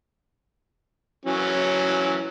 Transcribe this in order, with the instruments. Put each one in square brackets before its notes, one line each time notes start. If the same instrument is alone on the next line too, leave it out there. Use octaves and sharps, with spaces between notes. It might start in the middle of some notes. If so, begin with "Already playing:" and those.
[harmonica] E3 F#3 C#4